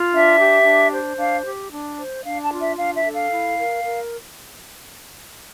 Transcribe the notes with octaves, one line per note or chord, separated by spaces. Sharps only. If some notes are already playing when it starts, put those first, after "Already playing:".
Already playing: F4
D4 E5
G4
D4
C5
D4 F5
G4
D4
C5
D4 F5
A5
F4
E5
D4 F5
E5
A4
F5
E4
A#4
A#4